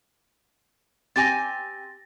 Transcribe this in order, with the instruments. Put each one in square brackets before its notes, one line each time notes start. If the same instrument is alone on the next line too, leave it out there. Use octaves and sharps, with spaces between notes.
[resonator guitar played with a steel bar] C4 G4 G#5 [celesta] A6 A#6